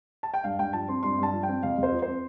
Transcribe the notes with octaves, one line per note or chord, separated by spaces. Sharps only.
A5
G5
G2 F5
G2 G5
F3 A5
C4 C6
G2 C6
G2 A5
F3
G5
C4
F2 F5
F2 C5
F3
C5
C4